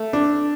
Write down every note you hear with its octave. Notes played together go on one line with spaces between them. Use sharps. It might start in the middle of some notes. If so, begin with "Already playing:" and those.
Already playing: A3
D4